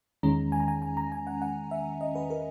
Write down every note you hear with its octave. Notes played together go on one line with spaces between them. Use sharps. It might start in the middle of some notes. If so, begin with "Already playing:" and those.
E2 D#3 G#3 C#4 A#5
G#5
A#5
G#5
G#5
A#5
G#5
F#5
F#5
E5
D#5
B4
A#4